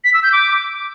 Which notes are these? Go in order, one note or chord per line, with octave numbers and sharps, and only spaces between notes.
B6
E6
G6
D6